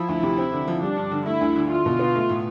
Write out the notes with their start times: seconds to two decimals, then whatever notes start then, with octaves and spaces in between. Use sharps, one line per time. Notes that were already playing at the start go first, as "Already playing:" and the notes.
Already playing: F3 E4
0.08 D2
0.23 C3
0.37 C4
0.52 D3
0.68 F3
0.82 G3 D4
0.96 G2
1.11 D3
1.26 A3 E4
1.41 D2
1.56 D3
1.70 E4 F4
1.86 B2
1.99 B3
2.15 A3
2.29 A2